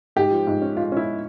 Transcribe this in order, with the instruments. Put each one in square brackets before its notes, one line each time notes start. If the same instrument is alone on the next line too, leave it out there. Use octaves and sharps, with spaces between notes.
[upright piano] G#2 [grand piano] G4
[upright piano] F3
G#2
C#4
[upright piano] G#3 [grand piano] F4
[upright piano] C#4 [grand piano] E4